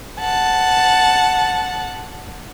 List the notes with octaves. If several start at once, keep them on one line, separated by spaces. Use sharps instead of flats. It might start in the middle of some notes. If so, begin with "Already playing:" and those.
F#5 A5